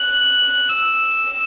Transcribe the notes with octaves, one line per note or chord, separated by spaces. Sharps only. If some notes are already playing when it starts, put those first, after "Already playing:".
Already playing: F#6
E6